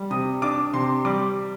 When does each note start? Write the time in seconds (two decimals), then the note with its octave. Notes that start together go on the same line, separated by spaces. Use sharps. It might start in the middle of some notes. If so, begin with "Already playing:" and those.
Already playing: G3
0.10 C3 D#6
0.42 D4 D6
0.73 C3 C6
1.05 G3 D6